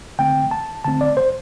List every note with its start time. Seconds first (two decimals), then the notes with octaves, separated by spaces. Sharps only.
0.19 D3 A3 C4 G5
0.51 A5
0.85 D3 A3 C4 A5
1.01 D5
1.17 C5